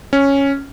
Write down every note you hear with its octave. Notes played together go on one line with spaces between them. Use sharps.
C#4